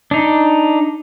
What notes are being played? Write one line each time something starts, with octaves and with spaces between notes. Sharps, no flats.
D4 D#4